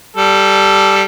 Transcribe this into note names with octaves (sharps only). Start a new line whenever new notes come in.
G3 A4